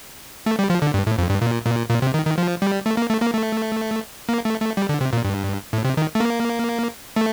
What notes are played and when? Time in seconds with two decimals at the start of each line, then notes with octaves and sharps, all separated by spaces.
0.46 A3
0.59 G3
0.70 F3
0.82 D3
0.94 G2
1.07 A2
1.18 F2
1.30 G2
1.42 A#2
1.66 A#2
1.90 A#2
2.02 C3
2.14 D#3
2.26 D#3
2.38 F3
2.62 G3
2.86 A3
2.97 A#3
3.09 A3
3.22 A#3
3.33 A3
4.29 A#3
4.45 A3
4.61 A3
4.77 G3
4.89 D3
5.01 C3
5.13 A#2
5.24 G2
5.73 A2
5.85 C3
5.97 D#3
6.15 A3
6.20 A#3
7.16 A3